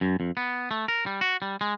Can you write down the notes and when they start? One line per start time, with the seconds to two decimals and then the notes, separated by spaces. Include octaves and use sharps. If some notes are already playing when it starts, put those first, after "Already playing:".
0.01 F#2
0.20 F2
0.37 B3
0.71 A3
0.88 A#4
1.06 G3
1.21 F#4
1.42 G3
1.61 G#3